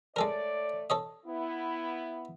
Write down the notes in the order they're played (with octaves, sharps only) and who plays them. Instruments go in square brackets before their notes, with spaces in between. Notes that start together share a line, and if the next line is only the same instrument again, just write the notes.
[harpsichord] G#3 A4 A#4 [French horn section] A3 C#5 D5
[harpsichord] A4 C#5 D#5
[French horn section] B3 E4